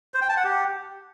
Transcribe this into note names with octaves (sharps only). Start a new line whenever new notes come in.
C5
G5
A5
F#5
G4